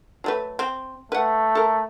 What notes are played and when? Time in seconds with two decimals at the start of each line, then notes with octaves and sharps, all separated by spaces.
0.24 F#3 A3 B4
0.59 C4
1.12 A3 B4 F#5
1.55 A4 A#4